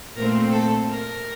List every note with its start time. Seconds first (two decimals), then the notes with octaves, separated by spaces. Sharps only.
0.15 A#2 A3 C4 A#4
0.52 A4
0.90 A#4